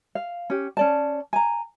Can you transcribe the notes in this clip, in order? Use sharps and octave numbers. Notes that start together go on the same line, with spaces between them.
F5
C#4 G4
C#4 D5 A5
G#5 A#5